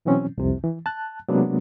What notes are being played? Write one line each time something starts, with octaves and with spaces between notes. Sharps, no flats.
B2 E3 F#3 C4 C#4
C2 F2 C3
E3
A5 F#6
C3 F#3 G#3 A#3 B3 D4